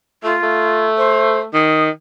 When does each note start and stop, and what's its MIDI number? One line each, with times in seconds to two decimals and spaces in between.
0.23 0.36 57
0.23 0.86 65
0.43 1.46 57
0.97 1.40 72
1.54 1.90 51
1.54 1.85 87